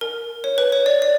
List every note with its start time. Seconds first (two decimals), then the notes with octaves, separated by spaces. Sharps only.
0.01 A#4
0.44 C#5
0.58 B4
0.72 C#5
0.86 D5
1.02 D5